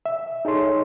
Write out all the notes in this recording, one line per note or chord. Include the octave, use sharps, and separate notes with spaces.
E5
D#4 G#4 A4 C#5 C6